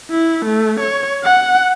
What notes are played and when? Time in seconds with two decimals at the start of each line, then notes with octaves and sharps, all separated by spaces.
0.11 E4
0.45 A3
0.80 C#5
1.24 F#5